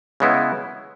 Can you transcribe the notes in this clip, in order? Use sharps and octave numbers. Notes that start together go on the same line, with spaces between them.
C#3 G#3 B3 E4